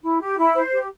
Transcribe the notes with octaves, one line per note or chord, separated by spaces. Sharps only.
E4
G4
E4
C5
G4